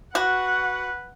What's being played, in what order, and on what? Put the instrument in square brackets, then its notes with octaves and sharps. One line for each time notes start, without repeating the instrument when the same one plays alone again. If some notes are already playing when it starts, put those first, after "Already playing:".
[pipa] F#4 [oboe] B4 [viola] F#5